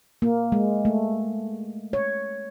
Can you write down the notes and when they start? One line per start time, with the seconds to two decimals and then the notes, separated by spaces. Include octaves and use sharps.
0.22 A#3
0.52 G#3
0.85 A3
1.93 C#5